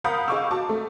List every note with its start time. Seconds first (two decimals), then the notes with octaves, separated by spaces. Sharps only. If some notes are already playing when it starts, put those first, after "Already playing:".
0.04 A#4 F5 F#5 B5 D#6 G6
0.28 G#4 D#5 F5 C#6 D6 E6
0.51 F#4 A5 D6
0.69 A3